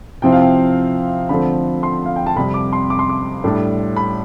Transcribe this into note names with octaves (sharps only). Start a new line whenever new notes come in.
C3 F3 C4 E4 G5
F5
G5
D3 F3 A3 C4 B5
C6
F5
G5
A5
F2 C3 G3 B5
D6
C6
D6
C6
D6
A2 G3 D4
B5